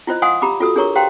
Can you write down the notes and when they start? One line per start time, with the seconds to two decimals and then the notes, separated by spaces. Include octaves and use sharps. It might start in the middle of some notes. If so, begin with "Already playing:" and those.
0.07 E4 F4 C5 D#5
0.22 D#5 F5 F#5 G#5 C6 D#6
0.42 G4 A#5 B5 D6
0.60 F4 F#4 A4 D#6 E6
0.76 D4 G#4 A#4 C#5 A#5 C#6
0.95 G4 C5 F5 G5 A#5 C6